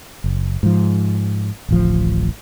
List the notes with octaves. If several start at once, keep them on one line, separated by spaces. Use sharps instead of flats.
F#1
G#2 F3
D1 A1 F3